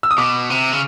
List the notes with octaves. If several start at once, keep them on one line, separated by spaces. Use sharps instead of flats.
E6
D#6
B2 D6
C3
C#3